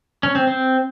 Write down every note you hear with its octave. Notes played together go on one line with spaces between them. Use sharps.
C#4
C4
C4